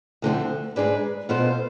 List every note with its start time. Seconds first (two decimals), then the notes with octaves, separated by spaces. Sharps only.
0.22 D2 D3 F3 A3 C4
0.76 G#2 G#3 D4 G#4 B4
1.29 B2 B3 F4 A4 C5